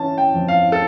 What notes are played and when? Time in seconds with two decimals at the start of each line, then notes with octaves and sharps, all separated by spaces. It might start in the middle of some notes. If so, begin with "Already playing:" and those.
Already playing: E3 C#4 A5
0.18 G5
0.34 F2
0.48 F5
0.72 A4